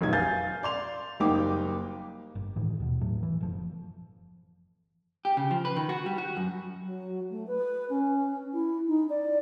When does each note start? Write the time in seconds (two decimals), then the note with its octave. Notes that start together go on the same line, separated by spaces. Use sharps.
0.01 F1 B1 D#4 G#6
0.13 F5 G#5 G6 A6
0.63 D5 C6 F7
1.20 F#1 G3 A#3 D#4 G5 D6
2.35 G1
2.56 A2 D#3 E3
2.80 D#2 B2
3.01 A2 F#3
3.23 E3
3.41 F#1 F3
5.25 G4
5.37 C#3
5.51 F3
5.65 B4
5.76 D#3
5.89 F#4
6.06 G3
6.18 F#4
6.37 F#2
6.84 F#3
7.30 A3
7.47 B4
7.90 C#4
8.53 E4
8.88 D#4
9.09 D5